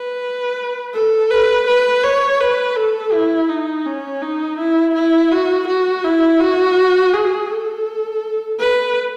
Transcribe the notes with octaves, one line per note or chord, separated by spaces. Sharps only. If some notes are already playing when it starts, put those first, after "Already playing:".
Already playing: B4
A4
B4
B4
C#5
B4
A4
E4
D#4
C#4
D#4
E4
E4
F#4
F#4
E4
F#4
G#4
A4
B4